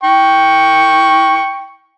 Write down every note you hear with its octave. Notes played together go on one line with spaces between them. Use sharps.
G5 C#6